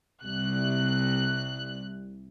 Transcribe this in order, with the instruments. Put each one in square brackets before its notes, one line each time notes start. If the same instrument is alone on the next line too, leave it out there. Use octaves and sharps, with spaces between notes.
[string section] C2 F#6